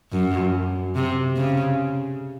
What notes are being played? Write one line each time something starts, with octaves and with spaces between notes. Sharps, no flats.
F#2
C3
C#3